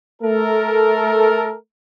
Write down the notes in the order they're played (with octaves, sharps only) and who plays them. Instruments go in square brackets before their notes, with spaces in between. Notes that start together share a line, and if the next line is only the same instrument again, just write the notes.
[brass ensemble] A3 A4 A#4